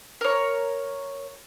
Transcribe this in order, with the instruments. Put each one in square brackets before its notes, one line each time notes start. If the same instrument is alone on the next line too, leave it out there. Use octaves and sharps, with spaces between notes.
[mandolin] A#4 C#5